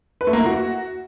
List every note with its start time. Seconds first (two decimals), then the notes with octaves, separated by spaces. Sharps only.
0.21 B4
0.27 A3
0.33 A#3
0.39 E4
0.46 F#4